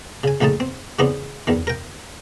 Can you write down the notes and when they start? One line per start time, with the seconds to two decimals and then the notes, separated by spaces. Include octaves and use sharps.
0.24 C#3 G#5
0.41 A#1 C#3 A3 D#4 A5
0.60 C4
0.99 C#3 E3 B3 C4 D4 D#4
1.47 E2 D#3
1.67 A#4 G5